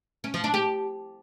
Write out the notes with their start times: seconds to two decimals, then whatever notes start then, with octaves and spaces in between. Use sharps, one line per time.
0.24 C#4
0.34 F3
0.44 D4
0.54 G4